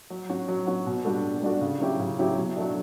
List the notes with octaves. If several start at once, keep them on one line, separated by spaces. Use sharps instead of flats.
F#3
C#4 F#4
F#3
C#4 F#4
B2
G3 D4 F#4 A4
B2
G3 D4 F#4 A4
C#3
F#3 C#4 E4 G4
C#3
F#3 C#4 E4 G4
B2
F#3 A3 D4